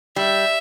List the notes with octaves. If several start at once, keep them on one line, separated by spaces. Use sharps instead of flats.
G3 E5